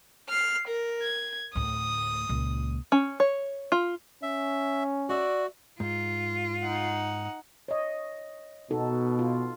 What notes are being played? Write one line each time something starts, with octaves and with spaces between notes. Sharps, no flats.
F6 C7
A#4
G#6
D2 A2 D#6
C#2 A#2
C#4
C#5
F4
C#4 E5
F#4 D5 E5
G#2 F4
D#4 F#5
C#5 D#5
B2 D#4 F#4 A4
F4